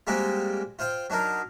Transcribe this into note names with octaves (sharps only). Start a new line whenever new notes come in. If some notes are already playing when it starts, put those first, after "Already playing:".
G3 G#3 A#3 C4 F#4 G4
F4 C5 F5 G5
F#3 D4 D#4 A#4